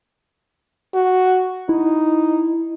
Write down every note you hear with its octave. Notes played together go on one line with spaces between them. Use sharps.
F#4
D#4 E4